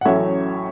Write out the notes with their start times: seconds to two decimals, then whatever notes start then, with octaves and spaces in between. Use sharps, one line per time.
0.01 F#5
0.05 A1 A2 F#3 C#4 C#5 E5